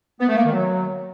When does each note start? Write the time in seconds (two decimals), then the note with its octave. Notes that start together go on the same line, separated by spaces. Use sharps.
0.20 B3
0.28 A3
0.37 A#3
0.45 D#3
0.53 F#3